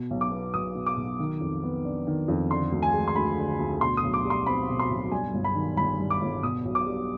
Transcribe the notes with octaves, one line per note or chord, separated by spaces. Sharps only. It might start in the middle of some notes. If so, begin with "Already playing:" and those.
Already playing: B2
B1
D6
B3
B1 D#6
B2
D6
B1
D#3
F2
B3
D4
D#3
F2
D3 C6
D2
G#5
G#3
C6
D2 B5
D3
D2
B2 C6
D#6
B1
D6
G3
C6
C4 B5
B2
C6
B1
G2 G#5
G1
B5
D#3
G1 B5
G2
D6
G1
B2 D#6
B1
D6
G3